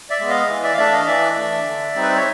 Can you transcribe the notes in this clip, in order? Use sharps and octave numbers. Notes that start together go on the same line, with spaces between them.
D5 E5
G#3 B3
D#5 F5
E3
D5 E5
F5
A3 D4 D5 E5
D#5 F5
E3 D5 E5
A3 D4
D3
G3 C4 D#4
B4
C5
C#5